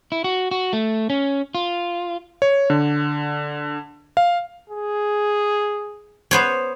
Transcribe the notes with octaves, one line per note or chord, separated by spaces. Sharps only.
E4
F#4
F#4
A3
C#4
F4
C#5
D3
F5
G#4
B3 C5 C#5